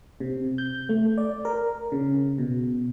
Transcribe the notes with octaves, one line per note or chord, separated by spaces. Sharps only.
C3
G6
A3
D5
A#4
C#3
B2